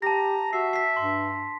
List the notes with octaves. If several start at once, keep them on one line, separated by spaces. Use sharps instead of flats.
G4 A5 A#5 A#6
F#4 E5 C7
B6 C7
G2 C6